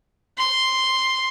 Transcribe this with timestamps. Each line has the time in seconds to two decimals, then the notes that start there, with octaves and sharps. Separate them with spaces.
0.38 C6